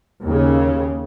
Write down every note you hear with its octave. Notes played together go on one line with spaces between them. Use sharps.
D#2 C#3